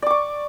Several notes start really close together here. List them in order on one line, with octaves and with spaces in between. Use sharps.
D5 D6 C#6